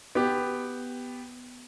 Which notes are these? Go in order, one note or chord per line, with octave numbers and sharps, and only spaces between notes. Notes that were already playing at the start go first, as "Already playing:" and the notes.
B3 G4